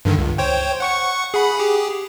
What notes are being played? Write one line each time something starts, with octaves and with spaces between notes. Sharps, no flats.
G2 D3 D#3
C#2
C5 C#5 G5
F#5 C#6 C#7
G#4 F#5 B5
G4 G#4